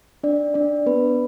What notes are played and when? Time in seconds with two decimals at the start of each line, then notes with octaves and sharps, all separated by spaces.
0.23 D4 D5
0.54 D4 D5
0.86 B3 B4